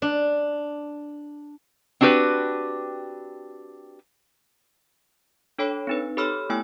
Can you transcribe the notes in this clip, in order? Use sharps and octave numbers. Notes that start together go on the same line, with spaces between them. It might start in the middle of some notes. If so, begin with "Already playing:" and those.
D4
C4 D4 F#4 G4 B4
D4 A4 C#5 G5 B5 D7
C4 D#4 B4
G4 A4 C#5 B5 E6 F6
A3 B3 E4 G5 G#5 E6